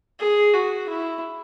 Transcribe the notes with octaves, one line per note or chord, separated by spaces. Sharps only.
G#4
F#4
E4